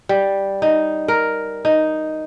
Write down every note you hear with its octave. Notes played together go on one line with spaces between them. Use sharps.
G3
D#4
A#4
D#4